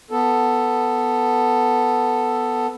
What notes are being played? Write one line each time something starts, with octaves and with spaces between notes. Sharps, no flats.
B3 A4